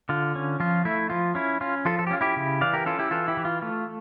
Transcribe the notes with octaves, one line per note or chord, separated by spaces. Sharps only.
D3 F4
C#4
F3 F4
A3 E4
F3 F4
C#4 E4
C#4 F4
F3 F4 A4
A4
G4
C#4 F4
E4 G4
C#3
E3 D5 F5
G4 A#4
C#4 F4 A4
E4 G4
E3 F4 A4
E4 G4
E3
F4
A3 F4